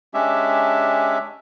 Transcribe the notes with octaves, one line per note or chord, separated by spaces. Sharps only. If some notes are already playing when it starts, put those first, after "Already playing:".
G#3 C#4 D4 G4 E5